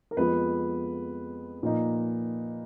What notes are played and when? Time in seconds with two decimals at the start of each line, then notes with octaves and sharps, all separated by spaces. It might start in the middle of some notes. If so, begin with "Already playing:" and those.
0.11 A#4
0.17 F2 F3 G#3 B3 F4 B4
1.63 A#2 F3 A#3 D#4